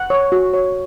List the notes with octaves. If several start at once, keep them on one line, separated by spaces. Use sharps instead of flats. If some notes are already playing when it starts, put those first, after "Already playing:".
Already playing: F#5
C#5
F#4
C#5